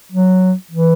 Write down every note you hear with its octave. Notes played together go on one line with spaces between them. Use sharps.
F#3
E3